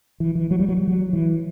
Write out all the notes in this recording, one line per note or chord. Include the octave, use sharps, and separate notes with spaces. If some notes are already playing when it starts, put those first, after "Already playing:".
E3
E3
F#3
G3
F#3
G3
F#3
E3